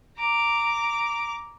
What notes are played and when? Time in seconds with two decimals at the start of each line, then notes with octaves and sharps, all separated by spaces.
0.18 A#5 D6